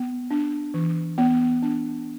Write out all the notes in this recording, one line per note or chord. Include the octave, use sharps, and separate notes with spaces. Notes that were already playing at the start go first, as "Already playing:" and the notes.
Already playing: B3
D4
E3
B3
D4